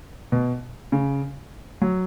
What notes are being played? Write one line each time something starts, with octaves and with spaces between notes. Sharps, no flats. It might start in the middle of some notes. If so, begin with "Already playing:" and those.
B2
C#3
F#3